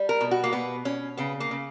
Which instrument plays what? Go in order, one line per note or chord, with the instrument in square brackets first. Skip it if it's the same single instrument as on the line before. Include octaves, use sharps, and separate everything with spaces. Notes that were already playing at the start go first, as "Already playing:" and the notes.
Already playing: [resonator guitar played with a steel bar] G3
A#4
B2
F#4
A#3
B2 B3
B2 C#4
C#3 B3
A#3
C#3